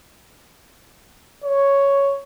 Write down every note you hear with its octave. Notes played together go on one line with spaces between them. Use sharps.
C#5